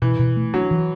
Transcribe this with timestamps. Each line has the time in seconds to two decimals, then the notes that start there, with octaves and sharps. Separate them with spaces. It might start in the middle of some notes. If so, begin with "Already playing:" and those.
0.02 B2 E3
0.19 B2
0.37 A3
0.54 F#3 D4
0.71 E3